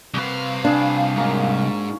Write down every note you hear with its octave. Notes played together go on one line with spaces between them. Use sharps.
C2 C3 F#4 G4 B4 F5
G3 D4 F4 G#4
G#2 F#3 A#3 C#4